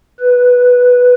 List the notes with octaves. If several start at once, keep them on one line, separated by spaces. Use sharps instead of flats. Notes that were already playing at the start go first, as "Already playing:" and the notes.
B4